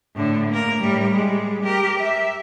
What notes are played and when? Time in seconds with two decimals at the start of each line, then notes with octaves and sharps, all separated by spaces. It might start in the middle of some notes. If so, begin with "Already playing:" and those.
0.15 A2 D3
0.50 A#3 A#4
0.79 A2 G3
1.14 G3 G#3
1.63 G4 A#4
1.99 E5